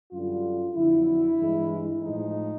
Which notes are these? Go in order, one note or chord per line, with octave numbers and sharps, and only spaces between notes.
F#2 D3 G3 F4
F2 D3 F#3 E4
G2 E3 G#3
A2 F3 G#3 D#4